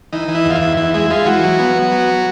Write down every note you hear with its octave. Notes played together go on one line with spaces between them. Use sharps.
E3 D#4
E3
E4
E2
F4
E4
E2
E2 E4
G#3 E4
G#3 F4
E3 F#4
F#3
B3
B3
F#3